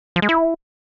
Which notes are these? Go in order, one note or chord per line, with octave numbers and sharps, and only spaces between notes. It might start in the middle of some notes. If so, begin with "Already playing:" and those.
F3
G#3
E4